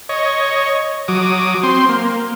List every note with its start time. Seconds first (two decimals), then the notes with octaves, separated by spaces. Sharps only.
0.09 C#5 D#5
1.08 F#3 D6 D#6
1.63 C4 C6
1.89 A#3